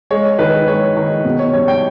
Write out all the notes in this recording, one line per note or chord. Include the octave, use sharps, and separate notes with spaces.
G#3 C#5
D#3 B4
G#3 C#5
D#3
B2
C#5
G3 C#5
G5